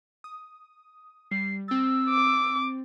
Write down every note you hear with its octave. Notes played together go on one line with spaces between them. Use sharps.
D#6
G3 C7
C4 E6 A6
D6